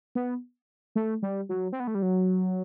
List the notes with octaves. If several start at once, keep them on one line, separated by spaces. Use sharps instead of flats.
B3
A3
G3
F#3
C4
B3
A3
G3
F#3